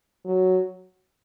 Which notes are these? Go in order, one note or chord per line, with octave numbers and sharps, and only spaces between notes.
F#3